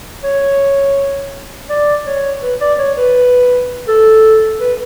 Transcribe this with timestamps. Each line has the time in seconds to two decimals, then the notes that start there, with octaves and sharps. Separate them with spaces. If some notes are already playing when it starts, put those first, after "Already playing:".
0.24 C#5
1.70 D5
2.06 C#5
2.42 B4
2.61 D5
2.79 C#5
2.97 B4
3.88 A4
4.60 B4